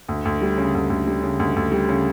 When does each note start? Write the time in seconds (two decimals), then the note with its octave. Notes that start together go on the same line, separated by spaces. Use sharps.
0.09 D2
0.25 D2
0.41 G3
0.58 C#3
0.74 D2
0.90 D2
1.07 G3
1.23 C#3
1.40 D2
1.56 D2
1.72 G3
1.89 C#3